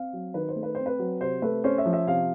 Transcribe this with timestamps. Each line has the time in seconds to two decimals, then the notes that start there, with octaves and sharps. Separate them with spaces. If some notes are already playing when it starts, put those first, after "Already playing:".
Already playing: C4 F5
0.13 F#3
0.34 D#3 B4
0.49 C5
0.56 A3
0.63 B4
0.75 C4 C5
0.86 B4
0.99 F#3
1.21 C3 C5
1.42 A3 B4
1.64 C#4 C5
1.78 E5
1.86 F3
1.93 E5
2.07 C3 F5